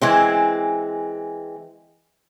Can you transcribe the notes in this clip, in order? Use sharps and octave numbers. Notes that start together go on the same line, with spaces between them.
E3 G#3 C4